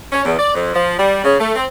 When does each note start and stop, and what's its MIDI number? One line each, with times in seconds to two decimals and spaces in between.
0.12 0.24 61
0.25 0.35 40
0.38 0.51 74
0.55 0.70 41
0.74 0.97 53
0.99 1.21 55
1.24 1.39 49
1.39 1.53 57
1.56 1.65 60